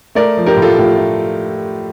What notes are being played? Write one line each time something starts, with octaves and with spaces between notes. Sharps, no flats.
A3 A#4 D5
F3
G4 A#4
A2
F4 A4
A2 F4
A3